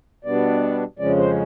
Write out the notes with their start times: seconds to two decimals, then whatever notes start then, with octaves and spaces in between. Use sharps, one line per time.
0.25 B2 G3 B3 D4 D5
0.99 F2 C#3 F3 G#3 C#4 D5
1.17 C5